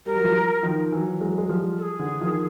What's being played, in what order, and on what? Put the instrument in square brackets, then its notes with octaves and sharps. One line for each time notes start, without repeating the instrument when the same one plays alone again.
[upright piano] G3 [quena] A#4
[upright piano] F#3
F3 G3
D#3 F3
E3 F#3
F#3 G#3
G#3
F3 G3
[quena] A4
G#4
[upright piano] D3 E3
D#3 F3